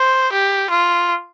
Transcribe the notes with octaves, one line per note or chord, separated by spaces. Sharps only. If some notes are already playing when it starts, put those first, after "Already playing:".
Already playing: C5
G4
F4